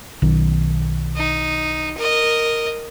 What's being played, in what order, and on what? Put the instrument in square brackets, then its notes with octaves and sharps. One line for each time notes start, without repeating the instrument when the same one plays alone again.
[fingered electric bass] B1 D#3
[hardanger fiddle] D#4
A#4 D#5